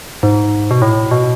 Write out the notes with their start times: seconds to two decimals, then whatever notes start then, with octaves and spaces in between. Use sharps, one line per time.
0.23 G#2
0.71 B2
0.82 A2
1.11 B2